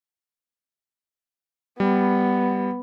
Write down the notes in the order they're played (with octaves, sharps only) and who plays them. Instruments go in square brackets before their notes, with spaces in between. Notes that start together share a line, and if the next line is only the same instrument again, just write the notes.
[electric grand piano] G3 [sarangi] B3